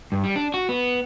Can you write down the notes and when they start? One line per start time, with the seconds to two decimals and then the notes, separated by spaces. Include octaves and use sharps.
0.12 G2
0.24 G3
0.36 D4
0.54 F#4
0.69 B3